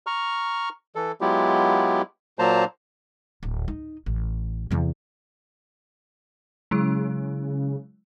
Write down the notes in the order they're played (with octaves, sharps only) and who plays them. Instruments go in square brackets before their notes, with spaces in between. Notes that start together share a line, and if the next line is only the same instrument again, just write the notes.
[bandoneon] A#5 C#6 F6
E3 A4
F#3 G#3 B3 E4 F4 G4
A#2 F#3 A#3 C5 A5 A#5
[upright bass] D1
D#4
A1
E2 C3
[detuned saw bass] C#3 [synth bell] F#3 G#3 E4